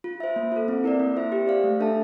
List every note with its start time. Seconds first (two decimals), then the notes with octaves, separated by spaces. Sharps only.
0.04 F4
0.20 C5 E5
0.36 A#3
0.52 F4 A4
0.68 C4
0.84 E4 A#4 D5
1.00 A#3
1.16 F4 C5 E5
1.32 G4
1.48 D5 F5
1.64 A3
1.80 D4 A4 E5 A5